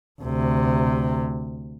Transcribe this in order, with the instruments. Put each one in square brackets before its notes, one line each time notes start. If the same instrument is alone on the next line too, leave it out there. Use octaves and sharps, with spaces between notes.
[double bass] D2 C3